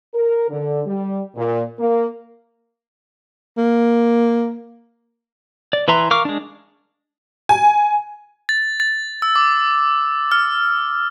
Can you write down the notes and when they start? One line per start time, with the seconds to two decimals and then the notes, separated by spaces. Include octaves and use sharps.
0.14 A#4
0.49 D3
0.86 G3
1.36 A#2
1.79 A#3
3.58 A#3
5.73 D5
5.88 E3 B4 E5 A#5 C6
6.11 A#4 F5 C#6 D6 F6
6.25 G#3 D4
7.49 G#5
8.49 A6
8.80 A6
9.22 E6
9.36 D6
10.32 F6